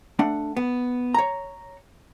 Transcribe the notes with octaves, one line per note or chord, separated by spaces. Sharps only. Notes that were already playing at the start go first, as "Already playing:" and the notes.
A3 D4 F#5
B3
C#5 A#5